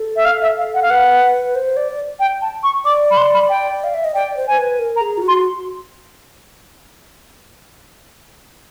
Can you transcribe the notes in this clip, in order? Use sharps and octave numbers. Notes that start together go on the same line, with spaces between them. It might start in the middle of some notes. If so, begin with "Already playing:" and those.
Already playing: A4
E5
F5
E5
F5
F#5
F5
B4 F#5
C5
D5
G5
A5
C#6
D5 D6
B5
C6
B5
G5
F5
E5
D#5
D5 G5
C5
C5 G#5
B4
A#4
A#5
G#4
F4
F#4
C6